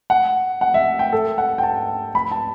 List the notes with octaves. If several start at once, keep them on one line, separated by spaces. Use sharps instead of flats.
F#5
F#5
E5
G5
A4
F#5
G5
A5
B5
A5